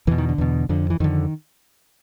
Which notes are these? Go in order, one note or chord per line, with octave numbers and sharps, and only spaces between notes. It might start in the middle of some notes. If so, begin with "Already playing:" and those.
E2 B2 D3 E3
D#3
D3
E2 B2
F2 D3
E3
F2 D3 D#3